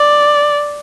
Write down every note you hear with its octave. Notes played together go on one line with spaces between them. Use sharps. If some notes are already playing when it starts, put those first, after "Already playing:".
Already playing: D5